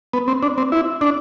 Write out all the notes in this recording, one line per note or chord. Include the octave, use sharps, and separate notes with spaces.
B3
C4
D4
C4
E4
D4